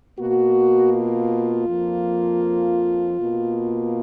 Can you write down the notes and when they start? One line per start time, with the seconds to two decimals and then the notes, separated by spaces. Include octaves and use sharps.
0.18 B2 A#3 F#4
0.93 F4
1.67 F2 F3 A#3
3.18 B2 A#3